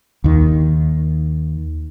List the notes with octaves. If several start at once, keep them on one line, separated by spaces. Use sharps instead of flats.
D#2 D#3